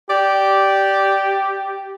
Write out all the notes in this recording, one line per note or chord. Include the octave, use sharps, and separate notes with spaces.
G4 D5